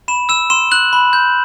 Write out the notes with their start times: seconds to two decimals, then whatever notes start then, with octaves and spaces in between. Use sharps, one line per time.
0.08 B5 E7
0.29 E6 E7
0.50 C6 E7
0.71 F#6 F#7
0.93 B5
1.13 G6